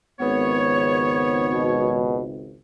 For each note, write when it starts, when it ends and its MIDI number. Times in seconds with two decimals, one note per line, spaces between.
0.20 2.56 32
0.20 2.56 37
0.20 1.99 59
0.20 1.99 73
1.53 2.22 47